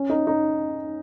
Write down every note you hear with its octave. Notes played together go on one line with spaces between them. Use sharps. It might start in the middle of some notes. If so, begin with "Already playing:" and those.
Already playing: C#4
D#4
D#4